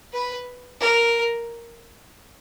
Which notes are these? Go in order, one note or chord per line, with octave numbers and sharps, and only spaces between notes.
B4
A#4